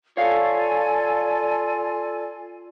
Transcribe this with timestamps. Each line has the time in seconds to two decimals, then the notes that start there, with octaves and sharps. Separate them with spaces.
0.17 F4 A4 C#5 D5 F5 G#5